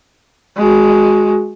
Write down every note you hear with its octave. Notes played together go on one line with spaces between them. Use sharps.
G#3 F#4